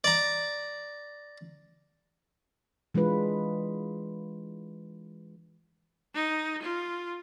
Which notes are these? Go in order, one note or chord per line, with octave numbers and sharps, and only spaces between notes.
D5 A#5
E3 G#3 D4 F4 B4
D#4
F4